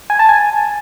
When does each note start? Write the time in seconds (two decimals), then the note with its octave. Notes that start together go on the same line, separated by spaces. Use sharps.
0.10 G#5
0.19 A5
0.29 G#5